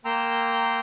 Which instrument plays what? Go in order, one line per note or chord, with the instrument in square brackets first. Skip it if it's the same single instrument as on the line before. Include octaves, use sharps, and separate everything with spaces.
[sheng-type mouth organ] A#3 G5 A#5 C6 E6